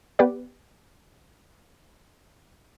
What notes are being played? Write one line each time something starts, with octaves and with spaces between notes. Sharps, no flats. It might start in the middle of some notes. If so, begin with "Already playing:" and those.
B3 G4 B4 D5